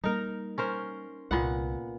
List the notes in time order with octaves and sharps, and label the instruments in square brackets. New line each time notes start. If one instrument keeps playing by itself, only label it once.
[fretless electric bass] G3 A#3 [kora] D#4 A#4
[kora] C#4 A#4 C5
[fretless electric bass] C2 [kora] A#2 B3 F#5